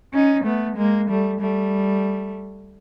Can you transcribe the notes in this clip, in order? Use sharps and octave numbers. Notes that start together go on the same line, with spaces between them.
C#4 D#4
A3 B3
G#3 A#3
G3 A3
G3 A3